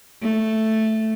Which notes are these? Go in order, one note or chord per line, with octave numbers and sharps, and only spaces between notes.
A3